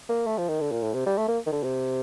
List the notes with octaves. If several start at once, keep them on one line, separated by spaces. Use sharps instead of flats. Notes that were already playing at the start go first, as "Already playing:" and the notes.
A#3
A3
F3
D#3
D3
A#2
A2
C3
G3
A3
A#3
D#3
D3
C3